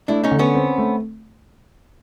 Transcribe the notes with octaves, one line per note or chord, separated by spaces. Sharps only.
A3 D4 E4
C#4 D#4
D3
B3 C#4
C4
A3